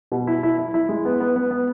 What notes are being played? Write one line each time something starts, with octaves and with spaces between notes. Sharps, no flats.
B2
E4
E4
E4
E4
G#3
B3
B3
B3
B3